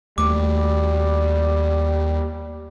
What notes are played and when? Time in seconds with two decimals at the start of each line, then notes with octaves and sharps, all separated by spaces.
0.18 D#2 G3 A3 D6